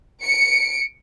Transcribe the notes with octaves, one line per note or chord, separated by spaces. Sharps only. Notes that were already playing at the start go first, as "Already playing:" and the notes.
C#7 D7